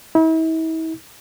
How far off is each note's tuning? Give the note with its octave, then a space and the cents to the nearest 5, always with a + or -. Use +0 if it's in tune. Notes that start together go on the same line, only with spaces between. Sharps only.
E4 -40